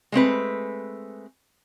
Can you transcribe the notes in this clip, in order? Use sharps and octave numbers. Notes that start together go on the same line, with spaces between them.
G#3 A3 C4 B4